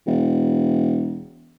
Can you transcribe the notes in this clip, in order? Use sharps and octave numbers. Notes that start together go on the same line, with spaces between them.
E1